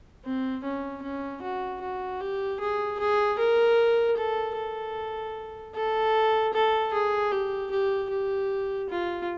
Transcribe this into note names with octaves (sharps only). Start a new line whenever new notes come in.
C4
C#4
C#4
F#4
F#4
G4
G#4
G#4
A#4
A4
A4
A4
A4
G#4
G4
G4
G4
F4